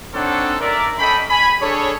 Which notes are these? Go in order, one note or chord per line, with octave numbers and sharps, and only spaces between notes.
C4 D4 D#4 A4 C#5 F#5
A#4 D5 E5
C#4 A4 D#5 G5 B5
G#5 B5
D4 G#4 A4 C#5